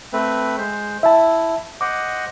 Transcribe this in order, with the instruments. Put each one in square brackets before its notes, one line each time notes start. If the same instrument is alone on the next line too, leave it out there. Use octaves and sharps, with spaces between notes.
[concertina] A3 C4 B4
G#3 C5
[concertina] E4 [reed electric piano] E5 A5
[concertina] C5 D#5 F#5 [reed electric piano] D6